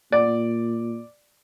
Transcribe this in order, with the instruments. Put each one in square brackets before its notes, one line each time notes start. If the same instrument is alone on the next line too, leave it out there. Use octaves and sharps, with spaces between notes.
[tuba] A#2 [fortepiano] D5